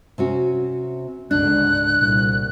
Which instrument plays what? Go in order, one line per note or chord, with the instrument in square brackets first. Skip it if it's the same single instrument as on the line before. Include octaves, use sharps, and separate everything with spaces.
[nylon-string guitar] C3 C#4 F#4
[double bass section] C#2 G#2 D3 [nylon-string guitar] D4 [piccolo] F#6
[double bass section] C2 A#2